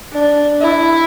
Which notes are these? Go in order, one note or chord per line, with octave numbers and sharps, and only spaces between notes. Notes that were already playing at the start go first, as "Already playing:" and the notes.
D4
E4